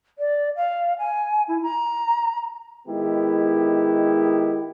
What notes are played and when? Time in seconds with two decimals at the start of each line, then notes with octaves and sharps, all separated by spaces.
0.19 D5
0.56 F5
0.99 G#5
1.48 E4
1.63 A#5
2.87 D#3 G#3 B3 E4 G4